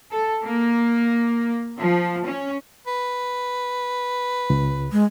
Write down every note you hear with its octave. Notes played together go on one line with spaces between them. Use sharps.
A4
A#3
F3
C#4
B4
C#2
G#3